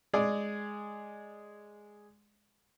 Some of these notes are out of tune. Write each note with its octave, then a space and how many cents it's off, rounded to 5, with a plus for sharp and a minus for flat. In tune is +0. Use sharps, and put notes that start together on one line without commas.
G#3 +0 G#4 +0 D5 +0